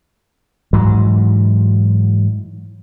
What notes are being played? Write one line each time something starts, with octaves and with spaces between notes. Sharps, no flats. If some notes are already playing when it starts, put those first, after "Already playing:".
G#2 E3 F#3